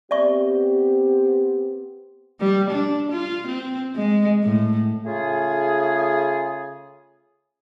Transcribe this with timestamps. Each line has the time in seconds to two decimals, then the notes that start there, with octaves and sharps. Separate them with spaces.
0.11 B3 C4 G4 D5 E5 C#6
2.40 G3
2.70 D4
3.11 F4
3.47 C4
3.96 G#3
4.43 A2
5.05 C#3 A3 F4 G#4